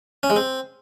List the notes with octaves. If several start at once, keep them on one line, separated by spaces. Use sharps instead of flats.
C#4
G#3
C4